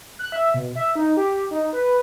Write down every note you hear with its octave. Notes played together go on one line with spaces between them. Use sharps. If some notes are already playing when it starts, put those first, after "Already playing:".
F#6
E5
B2
E5
D#4
G4
D#4
B4